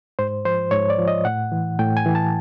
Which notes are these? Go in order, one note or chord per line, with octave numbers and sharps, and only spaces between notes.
G#2 C5
F3 C5
G#2 C#5
D5
F3
D#5
A2 F#5
E3
A2 G5
G#5
E3
A5